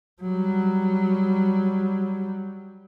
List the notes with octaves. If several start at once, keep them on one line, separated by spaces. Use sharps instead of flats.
F#3 G3